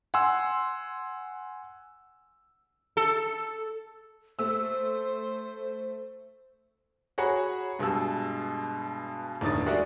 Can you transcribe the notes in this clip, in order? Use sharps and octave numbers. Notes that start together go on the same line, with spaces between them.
F#5 G#5 C6 E6
A4
A3 C5 E6
F#4 G#4 C#5 F#5 A#5 B5
G2 B2 G#3 A5 E6
E1 A2 D3 D#3 D#6 A6
G#3 F#4 A#4 D5 E5 F#5